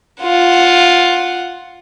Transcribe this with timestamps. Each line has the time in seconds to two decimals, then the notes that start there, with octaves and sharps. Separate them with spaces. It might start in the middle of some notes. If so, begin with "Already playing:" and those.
0.21 F4 F#5